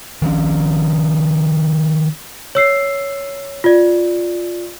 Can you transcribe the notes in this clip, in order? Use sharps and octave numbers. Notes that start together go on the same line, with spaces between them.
D#3 F3 B3 C#4
C#5 E6 C7
F4 D5